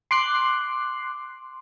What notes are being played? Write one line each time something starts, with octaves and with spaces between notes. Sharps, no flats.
C6 D6 F#6 C7